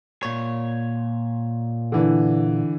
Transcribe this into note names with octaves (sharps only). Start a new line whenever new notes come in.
A#2 C#5
D3 E3